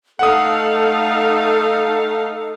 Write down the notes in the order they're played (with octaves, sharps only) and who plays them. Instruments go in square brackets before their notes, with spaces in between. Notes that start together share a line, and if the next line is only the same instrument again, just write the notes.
[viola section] A3 D#4 F5 [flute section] A4 [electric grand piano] F#5 D#6